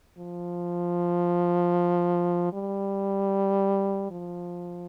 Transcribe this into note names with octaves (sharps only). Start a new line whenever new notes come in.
F3
G3
F3